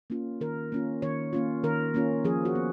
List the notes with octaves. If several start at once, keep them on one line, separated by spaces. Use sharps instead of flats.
A#3 C#4 F4
D#3 A#4
A#3 C#4 F4
D#3 C#5
A#3 C#4 F4
D#3 A#4
A#3 C#4 F4
F3 G#4
F#4
B3